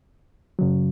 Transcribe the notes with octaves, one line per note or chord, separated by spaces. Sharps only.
F#2 C#3 F#3